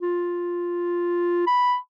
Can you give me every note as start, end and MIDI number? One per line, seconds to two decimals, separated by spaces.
0.01 1.44 65
1.47 1.76 83